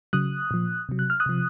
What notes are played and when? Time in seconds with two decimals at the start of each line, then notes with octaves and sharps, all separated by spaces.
0.13 C#3 F#3 D#6 F#6
0.51 A#2 F3
0.89 C3 F#3
0.99 F#6
1.10 F6
1.20 D#6 F#6
1.26 C3 F3